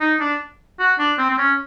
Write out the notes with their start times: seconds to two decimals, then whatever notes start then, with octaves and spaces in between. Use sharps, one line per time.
0.01 D#4
0.20 D4
0.79 F#4
0.99 D4
1.19 C4
1.30 C4
1.38 C#4